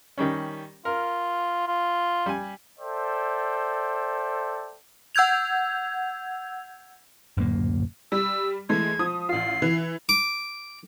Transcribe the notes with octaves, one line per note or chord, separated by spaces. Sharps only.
D#3 G3 C#4
F4 A#4
F4
G3 G#5
A4 C5 D5 E5 G5
F#5 E6 G6 G#6 F7
D1 F#2 A#2 A#3
G3 E6
E3 G#3 A3 G#6
F3 D#6
A1 F4 C7
E3
D6